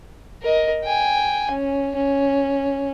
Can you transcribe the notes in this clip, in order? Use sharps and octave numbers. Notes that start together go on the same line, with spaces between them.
A#4 D#5
G5 G#5
C#4
C#4